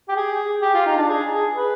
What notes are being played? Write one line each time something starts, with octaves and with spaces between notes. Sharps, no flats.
G4
G#4
G4
F4
D#4
D4
G#4
G#4
B4